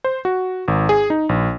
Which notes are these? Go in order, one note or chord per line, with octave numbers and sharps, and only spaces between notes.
C5
F#4
G#1
G#4
D#4
A#1